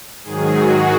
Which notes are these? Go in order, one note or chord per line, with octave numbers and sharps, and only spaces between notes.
G#2 D#3 F#3 G#4
F#4